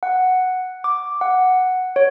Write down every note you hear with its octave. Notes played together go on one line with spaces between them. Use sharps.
F#5
D6
F#5
C#5